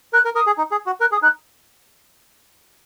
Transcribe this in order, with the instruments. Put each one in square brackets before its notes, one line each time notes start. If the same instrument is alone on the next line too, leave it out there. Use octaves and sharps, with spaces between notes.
[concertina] A#4 [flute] F#6
[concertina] A#4
[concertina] A#4 [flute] D#6
[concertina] G#4
D#4
G#4
F#4
[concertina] A#4 [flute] F#6
[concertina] G#4 [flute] D#6
[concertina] D#4 [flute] F#6